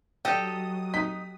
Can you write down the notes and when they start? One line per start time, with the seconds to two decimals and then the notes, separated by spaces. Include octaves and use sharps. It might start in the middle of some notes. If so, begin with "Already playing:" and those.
0.25 F#3 G4 A4 D#5 G5 D#6
0.94 D#4 B6